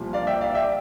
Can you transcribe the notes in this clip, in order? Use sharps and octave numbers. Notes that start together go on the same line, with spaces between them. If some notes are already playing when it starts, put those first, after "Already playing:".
Already playing: C2 A#2 F3
D5 F5
E5 G5
D5 F5
E5 G5